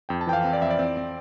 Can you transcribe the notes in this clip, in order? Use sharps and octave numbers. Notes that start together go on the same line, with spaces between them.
F2 G5
A5
E3 G5
F5
C4
D5
F2 E5
D5
C4
C4